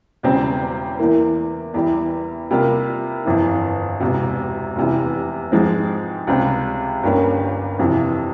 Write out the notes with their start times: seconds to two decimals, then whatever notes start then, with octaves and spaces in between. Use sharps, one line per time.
0.23 E1 E2 C#3 G3 C4
0.99 E2 E3 A#3
1.74 E2 E3 G3
2.51 C3 G3 A#3 F4
3.25 G1 F2 E3
4.00 E1 E2 C3
4.76 F1 E2 C3 E3
5.52 G#2 F3 G#3 C4
6.27 C#2 C3 G3 C4
7.03 G1 G2 G3 A#3 C#4
7.79 F2 C3 E3